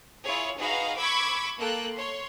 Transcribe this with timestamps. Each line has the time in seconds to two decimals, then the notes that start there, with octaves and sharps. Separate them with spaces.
0.24 E4 F4 G#4 C#5
0.57 D#4 F#4 G#4 B4 F5 A#5
0.97 B5 C#6 D6 E6 G#6 B6
1.59 A#3 A4 G5 F#6
1.94 C#5 C6